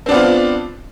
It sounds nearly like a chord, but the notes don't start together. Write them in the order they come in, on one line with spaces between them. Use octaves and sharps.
C4 D4 B3 F4